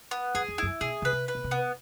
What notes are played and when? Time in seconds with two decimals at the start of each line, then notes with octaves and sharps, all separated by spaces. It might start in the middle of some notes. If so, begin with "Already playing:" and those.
0.11 B3
0.35 F#2 G#4
0.48 F2
0.58 F#2 E4
0.81 B2 G#4
1.02 C#3 B4
1.13 C3
1.28 B4
1.35 B2
1.44 C3
1.51 B3